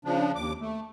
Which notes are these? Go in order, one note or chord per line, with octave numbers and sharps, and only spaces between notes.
C#3 F3 D4
D#2 D6
A3